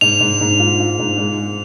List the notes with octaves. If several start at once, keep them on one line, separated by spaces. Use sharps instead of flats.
G#2 F7
G#2
G#2
F4
F4
G#2
G#3